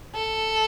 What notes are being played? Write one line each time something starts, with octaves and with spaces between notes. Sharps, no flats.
A4